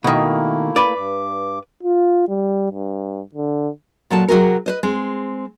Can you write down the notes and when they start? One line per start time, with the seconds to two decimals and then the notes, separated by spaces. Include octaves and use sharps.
0.04 B2 D#3 A3 A#3 E4
0.76 B4 D5
0.96 G2 D6
1.83 F4
2.28 G3
2.71 G2
3.34 D3
4.10 A#2 F#3 A4 A5
4.28 C3 F#3 A3 F#4 G#4 A#4
4.66 B4 C5 D#5
4.83 G#3 C4